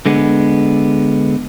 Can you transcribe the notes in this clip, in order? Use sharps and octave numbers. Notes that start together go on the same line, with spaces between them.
D3 G#3 B3